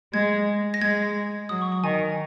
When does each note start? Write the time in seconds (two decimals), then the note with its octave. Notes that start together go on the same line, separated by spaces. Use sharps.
0.13 G#3 G#6
0.74 A#6
0.81 G#3 G#6
1.49 F#3 D#6
1.62 C#6
1.72 C#6
1.84 D#3 G#5